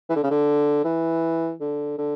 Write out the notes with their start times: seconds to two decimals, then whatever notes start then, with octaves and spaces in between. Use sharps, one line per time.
0.09 E3
0.16 D3
0.23 C#3
0.31 D3
0.84 E3
1.60 D3
1.98 D3